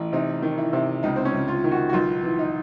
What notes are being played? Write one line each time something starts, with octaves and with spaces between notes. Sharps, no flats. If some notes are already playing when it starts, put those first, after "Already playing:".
Already playing: A1
C3 D#4
D#3
E4
C3
C#2 D#4
C4
C#4
C#2
F4
D#3
F#4
F#4
B1 F4
E3
D#4